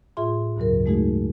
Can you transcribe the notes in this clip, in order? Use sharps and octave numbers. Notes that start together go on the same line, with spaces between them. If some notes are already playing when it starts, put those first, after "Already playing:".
A2 F4 G#4 E5 C6
D2 G2 C#3 F#3 A#4
G#3 A3 D#4 F#4 G#4